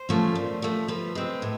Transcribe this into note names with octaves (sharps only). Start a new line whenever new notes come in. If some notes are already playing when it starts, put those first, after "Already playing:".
Already playing: C5
F3 A3 C#4
A#2
F3 A3
F3 B4
G#3 C4
A2